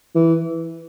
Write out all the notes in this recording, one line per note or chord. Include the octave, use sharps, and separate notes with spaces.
E3